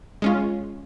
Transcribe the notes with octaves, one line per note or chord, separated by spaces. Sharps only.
G#3 C#4 F4